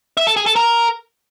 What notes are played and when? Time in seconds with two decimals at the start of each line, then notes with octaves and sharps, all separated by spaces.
0.17 E5
0.27 A4
0.37 G#4
0.46 A4
0.56 A#4